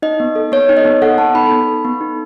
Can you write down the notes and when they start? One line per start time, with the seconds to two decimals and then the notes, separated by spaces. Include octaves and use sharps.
0.02 D#4 D#5
0.20 B3
0.36 A4
0.52 B3 C#5
0.69 D#4
0.77 D#5
0.85 B3
1.02 A4 F#5
1.18 B3 A5
1.34 D#4 B5
1.51 B3
1.68 A4
1.85 B3
2.01 D#4